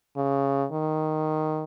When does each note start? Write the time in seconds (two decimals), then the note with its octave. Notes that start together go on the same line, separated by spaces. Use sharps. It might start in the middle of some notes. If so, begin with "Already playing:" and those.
0.17 C#3
0.71 D#3